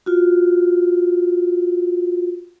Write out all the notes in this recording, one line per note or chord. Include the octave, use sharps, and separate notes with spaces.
F4 F#4